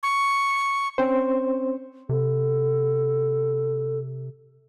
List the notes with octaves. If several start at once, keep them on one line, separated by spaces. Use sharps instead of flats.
C#6
C4 C#4 C5
C3 A4